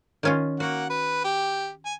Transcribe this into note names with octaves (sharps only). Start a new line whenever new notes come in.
D#3 C#4 F4
A#3 F#4 F#5
B4
G4
G#5